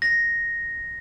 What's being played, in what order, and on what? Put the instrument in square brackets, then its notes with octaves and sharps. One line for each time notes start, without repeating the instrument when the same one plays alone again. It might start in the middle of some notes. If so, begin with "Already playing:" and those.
[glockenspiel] A#6